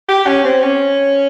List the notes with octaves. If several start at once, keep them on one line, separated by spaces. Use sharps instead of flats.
G4
C#4
C4
C#4